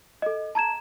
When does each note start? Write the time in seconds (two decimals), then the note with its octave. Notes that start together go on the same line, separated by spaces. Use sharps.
0.22 A4 D#5
0.55 A5 A#5 G#6 E7